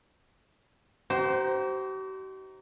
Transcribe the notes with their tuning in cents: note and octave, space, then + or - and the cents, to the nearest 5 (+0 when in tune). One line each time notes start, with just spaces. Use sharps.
D#4 +0 G4 -45 C5 +0